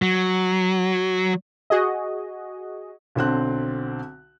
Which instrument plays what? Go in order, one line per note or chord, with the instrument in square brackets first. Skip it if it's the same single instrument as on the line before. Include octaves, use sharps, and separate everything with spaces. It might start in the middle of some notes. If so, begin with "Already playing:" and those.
[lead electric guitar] F#3
[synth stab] F#4 G#4 D#5
[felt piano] B1 D3 C4 F#6